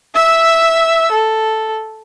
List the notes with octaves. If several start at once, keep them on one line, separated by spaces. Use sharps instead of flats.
E5 E6
A4